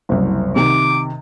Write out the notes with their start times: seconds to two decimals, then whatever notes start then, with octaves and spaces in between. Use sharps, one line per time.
0.09 F#1 C2
0.56 C3 D#3 D6